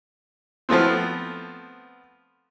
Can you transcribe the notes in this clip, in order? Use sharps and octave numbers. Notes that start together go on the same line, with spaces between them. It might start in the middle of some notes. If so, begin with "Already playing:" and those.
F3 A3 B3 C4